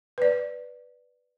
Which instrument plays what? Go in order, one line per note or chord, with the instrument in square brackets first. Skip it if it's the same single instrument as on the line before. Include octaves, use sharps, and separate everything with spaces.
[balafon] B4 D5